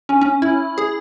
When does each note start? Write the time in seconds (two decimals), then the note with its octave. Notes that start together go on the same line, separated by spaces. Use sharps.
0.09 C#4
0.21 C#4
0.42 E4
0.78 G#4